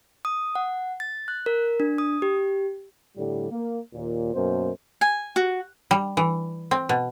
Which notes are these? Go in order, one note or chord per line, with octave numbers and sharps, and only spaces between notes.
D#6
F#5
A6
F#6
A#4
D4
D#6
G4
A2 D3 G3
A#3
D#2 A#2
F#2 B2 A#3 C5
G#5
F#4
G3
E3
C4
B2